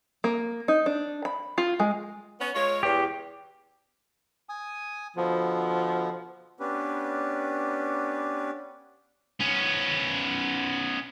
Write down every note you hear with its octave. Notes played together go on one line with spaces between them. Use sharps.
A#3
D#4
D4
B5
F4
G#3
B3 C#4
G#3 F4 C#5
E2 G4
G#5 D#6
B2 D3 F3 B3
B3 C#4 D4 G4 B4
B3 C#4